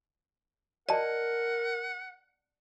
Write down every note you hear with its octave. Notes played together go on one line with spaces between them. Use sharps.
A#4 D5 D#5 F#5 A5